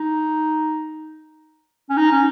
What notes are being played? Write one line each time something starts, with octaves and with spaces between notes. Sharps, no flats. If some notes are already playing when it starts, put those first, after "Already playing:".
Already playing: D#4
C#4
D#4
C#4